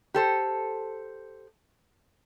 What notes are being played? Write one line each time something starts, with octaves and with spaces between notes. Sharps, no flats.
G4 A4 C5